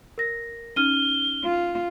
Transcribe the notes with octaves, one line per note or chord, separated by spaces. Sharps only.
A#4 A#6
C#4 D#4 F6 D#7 G7
F4